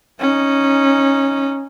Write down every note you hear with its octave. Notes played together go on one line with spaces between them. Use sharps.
C#4 D#4